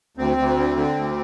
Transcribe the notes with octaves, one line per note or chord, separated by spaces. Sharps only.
D2 C4
D2
D3
D3
D2